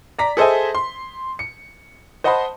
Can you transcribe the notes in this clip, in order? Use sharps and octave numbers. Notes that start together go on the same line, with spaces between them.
D5 A#5 B6
G#4 A4 C5 D#5 E5 G#5
C6
C#7
C5 D#5 F#5 A5 B5 C6